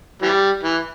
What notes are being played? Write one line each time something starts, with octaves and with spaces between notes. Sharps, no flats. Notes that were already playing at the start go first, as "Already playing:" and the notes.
E3 G3
E3